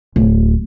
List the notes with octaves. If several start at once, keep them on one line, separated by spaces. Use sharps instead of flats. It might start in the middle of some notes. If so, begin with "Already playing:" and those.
D1